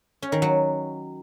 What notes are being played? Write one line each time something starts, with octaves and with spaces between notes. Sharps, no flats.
C#4
D#3
F#3